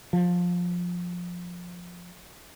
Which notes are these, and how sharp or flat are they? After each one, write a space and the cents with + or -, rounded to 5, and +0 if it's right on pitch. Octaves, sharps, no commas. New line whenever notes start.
F3 +15